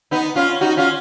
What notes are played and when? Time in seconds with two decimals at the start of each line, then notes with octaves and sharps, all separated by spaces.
0.11 B3 D#4
0.36 C#4 F4
0.61 D#4 F#4
0.77 C#4 F4